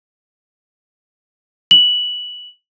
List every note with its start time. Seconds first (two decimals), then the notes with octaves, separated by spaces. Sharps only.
1.71 F#7